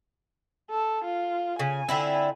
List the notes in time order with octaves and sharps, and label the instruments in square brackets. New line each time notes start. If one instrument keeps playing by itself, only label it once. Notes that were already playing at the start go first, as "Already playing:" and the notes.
[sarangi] A4
F4
[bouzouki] C#3 [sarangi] G#5
[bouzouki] D3 C4 E4